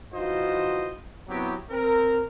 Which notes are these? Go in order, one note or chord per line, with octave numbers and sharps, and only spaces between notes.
E3 D#4 F4 F#4 C5 D#5
F#3 B3 C4 E4 G4
C4 A#4